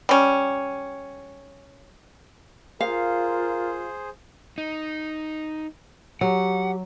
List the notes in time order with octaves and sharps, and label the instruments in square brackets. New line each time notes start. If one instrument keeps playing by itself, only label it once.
[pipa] G3 C#4
[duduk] F4 [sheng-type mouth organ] G#4 C5 [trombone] A#4 [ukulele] F5
[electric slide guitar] D#4
[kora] F#3 [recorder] G4 [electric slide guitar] F#5